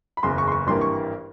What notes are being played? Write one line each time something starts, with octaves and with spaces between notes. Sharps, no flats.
B5
F#1 E2 C#3 C6
C#6
C6
C#6
G#1 G2 E3 G3 A#3 C6
C#6